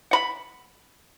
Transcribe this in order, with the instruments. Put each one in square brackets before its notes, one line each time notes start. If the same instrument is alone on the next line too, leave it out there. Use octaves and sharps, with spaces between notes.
[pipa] F#5 B5